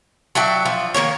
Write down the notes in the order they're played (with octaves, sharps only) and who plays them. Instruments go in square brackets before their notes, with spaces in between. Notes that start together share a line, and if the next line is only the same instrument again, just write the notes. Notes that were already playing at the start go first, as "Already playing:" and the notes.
[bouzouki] F#3 D4 E5 G5
F3
D#3 G3 A#3 C#5